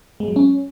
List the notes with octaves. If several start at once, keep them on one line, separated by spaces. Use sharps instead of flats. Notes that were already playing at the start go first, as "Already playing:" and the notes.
G#3
F#3
C#4